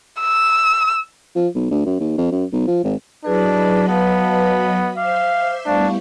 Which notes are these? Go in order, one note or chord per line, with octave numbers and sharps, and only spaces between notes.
E6
F3
B1
D2
F#2
D#2
F2
F#2
B1
F3
G#1
F#3 D4 E4 G#4 B4 D#5 B5
B3 B4 F5 A5
C5 E5 F5 C6 D6
G3 A3 B3 D4 E4 F5 C#6